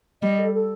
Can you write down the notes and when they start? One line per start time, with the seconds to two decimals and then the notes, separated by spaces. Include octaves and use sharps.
0.22 G3 D#5
0.39 A4
0.54 A4